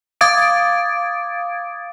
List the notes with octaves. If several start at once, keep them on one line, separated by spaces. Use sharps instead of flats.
F5 D6 D#6 G#6 A6 D7